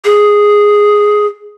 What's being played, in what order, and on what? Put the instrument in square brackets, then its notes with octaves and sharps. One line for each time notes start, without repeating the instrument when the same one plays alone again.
[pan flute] G#4